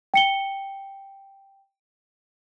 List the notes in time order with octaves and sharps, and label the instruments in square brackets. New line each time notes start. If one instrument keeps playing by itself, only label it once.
[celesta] G5 C#7 G7